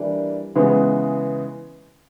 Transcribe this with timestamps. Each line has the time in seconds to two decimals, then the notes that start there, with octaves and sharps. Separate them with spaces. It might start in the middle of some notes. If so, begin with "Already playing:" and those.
Already playing: E3 G3 A#3 D4
0.55 C#3 E3 G#3 B3